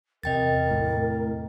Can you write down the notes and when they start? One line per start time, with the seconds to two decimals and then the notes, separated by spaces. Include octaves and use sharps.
0.23 E2 C3 A#4 D#5 G5 A6
0.71 A2